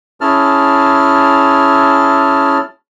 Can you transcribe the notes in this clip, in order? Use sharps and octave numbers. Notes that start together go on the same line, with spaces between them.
C#4 E4 G#4 A5 F6